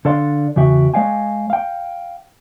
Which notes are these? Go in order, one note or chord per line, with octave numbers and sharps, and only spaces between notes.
D3 A4 D5 F5 C6
E2 C#3 F#4 E5 G5
G#3 C#5 D#5 F5 G5 G#5
F5 G5